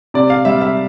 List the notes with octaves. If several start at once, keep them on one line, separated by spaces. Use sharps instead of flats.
C3 D5
F5
G3 E5
E5